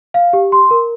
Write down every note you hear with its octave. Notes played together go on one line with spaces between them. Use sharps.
F5
G4
C6
A#4